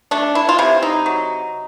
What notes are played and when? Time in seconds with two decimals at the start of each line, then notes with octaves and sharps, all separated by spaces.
0.11 A3 D4
0.35 E4
0.49 F4
0.58 C3 E4
0.82 D#4
1.06 F#3